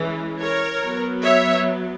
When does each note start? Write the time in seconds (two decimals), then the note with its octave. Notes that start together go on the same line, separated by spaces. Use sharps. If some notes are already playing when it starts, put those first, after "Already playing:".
Already playing: E3 G#3 C#4
0.40 A#4 C#5
0.83 F#3 B3
1.24 C#5 E5